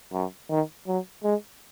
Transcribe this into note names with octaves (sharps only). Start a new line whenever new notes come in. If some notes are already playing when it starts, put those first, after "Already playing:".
F#2
D#3
F#3
G#3